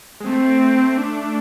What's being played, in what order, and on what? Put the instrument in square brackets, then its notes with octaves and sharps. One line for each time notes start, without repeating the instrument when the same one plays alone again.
[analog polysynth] G#3
[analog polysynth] A3 [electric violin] C4
[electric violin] D4